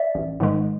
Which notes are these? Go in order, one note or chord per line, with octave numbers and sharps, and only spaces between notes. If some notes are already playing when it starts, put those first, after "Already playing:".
Already playing: D5 E5
A1
G#2 D#3 G#3